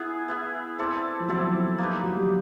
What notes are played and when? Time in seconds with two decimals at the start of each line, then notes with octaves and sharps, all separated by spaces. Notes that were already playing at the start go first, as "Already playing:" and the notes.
Already playing: B3 E4 G#4
0.28 B3 E4 G#4
0.78 C4 E4 A4 D5
1.20 F3
1.28 F#3 C4 E4 A4 D5
1.78 A#3 D#4 G4 B4
2.04 F#3
2.17 G3